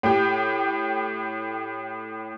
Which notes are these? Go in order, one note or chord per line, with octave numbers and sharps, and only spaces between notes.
A2 G4